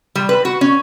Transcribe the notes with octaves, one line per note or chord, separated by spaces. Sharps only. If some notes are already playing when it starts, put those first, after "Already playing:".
G3
B4
F#4
C#4